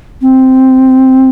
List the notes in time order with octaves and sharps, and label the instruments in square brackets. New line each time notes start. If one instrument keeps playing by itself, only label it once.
[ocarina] C4